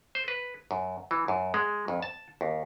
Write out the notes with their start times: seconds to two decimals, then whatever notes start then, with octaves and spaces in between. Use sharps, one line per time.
0.15 C5
0.28 B4
0.71 F#2
1.11 E3
1.28 F#2
1.54 G#3
1.88 F2
2.02 A5
2.41 D#2